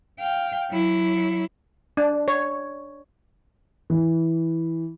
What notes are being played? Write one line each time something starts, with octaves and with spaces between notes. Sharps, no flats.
F5 G5
F#3 E4
D4
C#5
E3